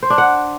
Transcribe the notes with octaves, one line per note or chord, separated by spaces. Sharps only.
C5
D4
F#5